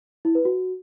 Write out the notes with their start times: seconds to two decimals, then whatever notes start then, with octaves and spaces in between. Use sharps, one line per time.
0.25 E4
0.35 B4
0.45 F#4